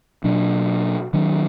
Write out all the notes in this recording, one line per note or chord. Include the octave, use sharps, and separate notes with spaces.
B2 F#3 D4
D#3 F#3 D4